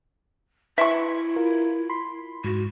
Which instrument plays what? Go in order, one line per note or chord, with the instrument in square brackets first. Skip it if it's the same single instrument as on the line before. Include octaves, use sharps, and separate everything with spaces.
[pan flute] E4 [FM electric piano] B4 C6 [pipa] E5 C#6
[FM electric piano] F4 A#4
B5 C6
[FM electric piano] G#2 [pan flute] F#4